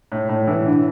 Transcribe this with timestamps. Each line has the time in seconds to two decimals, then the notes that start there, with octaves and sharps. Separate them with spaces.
0.12 A2
0.29 A2
0.47 E3
0.65 D3